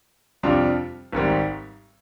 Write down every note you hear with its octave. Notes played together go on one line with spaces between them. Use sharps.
F2 C3 G3 D4 F4
G#1 G#2 G3 C4